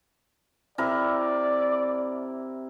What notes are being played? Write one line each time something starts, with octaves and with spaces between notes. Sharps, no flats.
C3 E4 A#4 D5